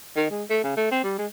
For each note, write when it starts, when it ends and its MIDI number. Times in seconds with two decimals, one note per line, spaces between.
0.16 0.26 51
0.30 0.43 56
0.50 0.60 57
0.64 0.75 49
0.76 0.87 57
0.91 1.00 60
1.04 1.18 55
1.18 1.26 56